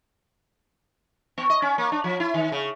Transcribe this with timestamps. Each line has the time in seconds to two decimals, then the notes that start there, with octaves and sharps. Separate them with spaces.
1.38 B3
1.50 D#5
1.62 C#4
1.78 A#3
1.92 D4
2.04 F3
2.20 E4
2.34 D#3
2.52 C#3